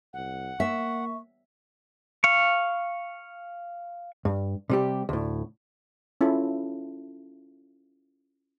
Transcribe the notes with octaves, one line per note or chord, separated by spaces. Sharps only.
C2 F#5
A#3 E5 C#6
F5 C#6
G2
C3 G3 G4
D2 A2
C#4 E4 F4 A4